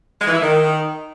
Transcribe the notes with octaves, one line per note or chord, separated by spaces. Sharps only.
G#3
E3
E4
D#3